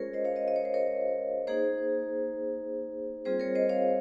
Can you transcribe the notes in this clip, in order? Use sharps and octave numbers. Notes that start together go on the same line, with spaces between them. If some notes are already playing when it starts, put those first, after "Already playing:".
Already playing: G#3 C#4 F4 G#4 A#4 C5 C#5
C5 D#5
C#5 F5
C5 D#5
D#5
C#5
C5
A#4 C#5
A#3 D#4 G#4 C5
G3 C4 F4 G#4 C5
A#4 C#5
C5 D#5
C#5 F5